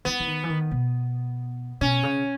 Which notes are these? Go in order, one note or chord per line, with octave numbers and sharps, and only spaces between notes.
E3 B3
E3
D#3
E3
D#3
B2
B2 C#4
C#3